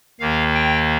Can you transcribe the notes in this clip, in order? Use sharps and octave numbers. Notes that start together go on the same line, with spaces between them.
D#2 D#3 A#3 F5
G5